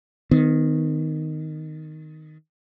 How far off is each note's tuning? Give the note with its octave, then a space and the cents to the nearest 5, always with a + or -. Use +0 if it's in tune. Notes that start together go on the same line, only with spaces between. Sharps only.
D#3 -5 B3 +40